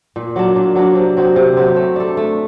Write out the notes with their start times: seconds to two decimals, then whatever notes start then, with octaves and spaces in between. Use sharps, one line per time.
0.16 A#2
0.36 F#3 A#3 D4
0.56 A#2
0.76 F#3 A#3 D4
0.95 C3
1.17 F#3 C4 G4
1.36 C3
1.57 F#3 C4 G4
1.76 A3
1.96 D4 A4
2.17 A3